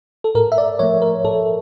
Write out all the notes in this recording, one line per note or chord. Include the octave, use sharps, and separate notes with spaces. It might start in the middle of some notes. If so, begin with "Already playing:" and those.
A4
A2 A#4
E5
D5
F3 A3 C#5
A#4
A2 A4